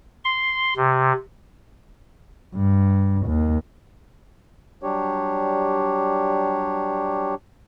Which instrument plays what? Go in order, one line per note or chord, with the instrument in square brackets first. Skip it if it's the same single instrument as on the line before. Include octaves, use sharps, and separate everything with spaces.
[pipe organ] C6
C3
[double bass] G2
D#2
[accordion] F#3 G3 D4 G4 C#5